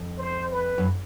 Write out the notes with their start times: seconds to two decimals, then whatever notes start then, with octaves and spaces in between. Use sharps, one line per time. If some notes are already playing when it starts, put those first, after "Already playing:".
Already playing: F2
0.18 C5
0.52 B4
0.78 F#2